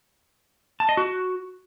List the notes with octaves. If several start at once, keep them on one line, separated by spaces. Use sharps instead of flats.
A5
D#5
F#4